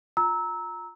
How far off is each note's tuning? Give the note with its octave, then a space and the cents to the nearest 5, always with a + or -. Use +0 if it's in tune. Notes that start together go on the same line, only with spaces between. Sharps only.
F4 +15 A#5 +0 E6 -20